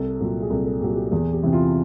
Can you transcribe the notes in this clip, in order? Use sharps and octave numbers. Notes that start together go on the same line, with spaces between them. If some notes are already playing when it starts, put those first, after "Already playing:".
Already playing: C2 A4
A#2 F#3
G#4
C2 A4
A4
A#2 F#3 G4
G4
E2 G#4
G4
C3 E3
F4